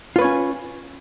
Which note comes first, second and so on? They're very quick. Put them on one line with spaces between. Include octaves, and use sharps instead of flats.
F4 B4 C#5 C#4